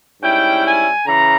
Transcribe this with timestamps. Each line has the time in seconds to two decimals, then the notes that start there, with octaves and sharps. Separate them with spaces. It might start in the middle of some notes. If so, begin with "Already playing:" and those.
0.21 G#2 G3 C#4 E4 G5
0.64 G#5
1.06 C#3 E3 A#5